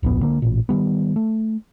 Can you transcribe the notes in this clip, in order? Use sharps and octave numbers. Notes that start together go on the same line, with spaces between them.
D1 A#1 F2 B3
C#2 D3 A#3
A1 A#2
D#3 F#3 G3 B3
A3